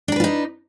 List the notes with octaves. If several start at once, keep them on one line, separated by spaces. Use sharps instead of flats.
D4 D#4 F4 A#4 B4